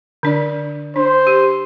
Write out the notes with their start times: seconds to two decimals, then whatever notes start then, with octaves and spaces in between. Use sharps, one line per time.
0.23 D3 D4 D5
0.96 D4 C5
1.27 G4